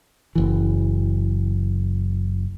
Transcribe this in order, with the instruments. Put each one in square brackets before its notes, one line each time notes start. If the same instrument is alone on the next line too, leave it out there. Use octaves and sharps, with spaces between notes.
[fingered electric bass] F#1 E3